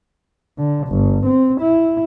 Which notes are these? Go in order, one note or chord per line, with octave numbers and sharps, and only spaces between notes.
D3
G1
C4
E4